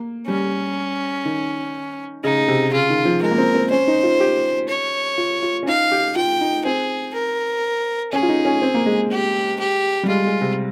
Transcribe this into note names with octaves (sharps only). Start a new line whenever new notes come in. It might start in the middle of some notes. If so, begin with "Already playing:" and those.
Already playing: A#3
G3 C#4
D#3
C#3 D#4
C3
C#3 F4
D#3
F3
G#3 A#4
A#3
C4
C4
C#4 C5
D#4
F4
G4
C#5
F4
F4
C#4
D#4 F5
G4
F4 G5
D#4
C4 G#4
A#4
C#4 G#4
F4
D#4
C#4
C4
A#3
G#3
G4
G4
G3
G#3 F4
G#3
C3